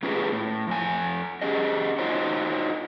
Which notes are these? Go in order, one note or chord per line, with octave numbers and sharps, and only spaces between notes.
A3 C#4 F4 G4 G#4 B4
A2
F2 G#5
C#4 G4 G#4 D#5
D#4 F4 F#4 C5 C#5 D#5